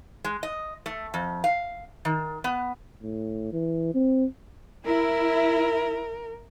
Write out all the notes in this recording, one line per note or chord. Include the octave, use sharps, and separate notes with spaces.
G#3
D#5
A3
F2
F5
D#3
B3
A2
E3
C4
E4 A#4